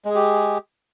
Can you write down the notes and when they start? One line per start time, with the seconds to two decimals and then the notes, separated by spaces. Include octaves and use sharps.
0.05 G#3
0.10 G#4
0.15 G4